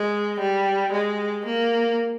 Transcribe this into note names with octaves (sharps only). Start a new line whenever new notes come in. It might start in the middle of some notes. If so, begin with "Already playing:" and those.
Already playing: G#3
G3
G#3
A#3